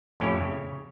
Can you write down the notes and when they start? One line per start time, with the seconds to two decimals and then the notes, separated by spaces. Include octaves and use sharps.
0.20 F2 A2 C#4 E4 G4 C#5
0.41 C#3